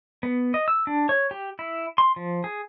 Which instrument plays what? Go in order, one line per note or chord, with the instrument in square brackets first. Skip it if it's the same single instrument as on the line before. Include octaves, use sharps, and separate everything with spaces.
[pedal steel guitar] B3
D#5
E6
D4
C#5
G4
E4
C6
F3
G#4